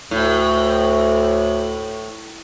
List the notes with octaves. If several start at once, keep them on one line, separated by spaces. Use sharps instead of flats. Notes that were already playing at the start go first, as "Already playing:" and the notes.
D2 A2